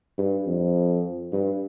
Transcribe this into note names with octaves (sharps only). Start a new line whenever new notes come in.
G2
F2
G2